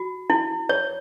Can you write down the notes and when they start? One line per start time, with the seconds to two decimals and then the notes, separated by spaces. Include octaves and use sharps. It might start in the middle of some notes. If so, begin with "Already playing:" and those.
Already playing: F#4
0.30 E4
0.69 C#5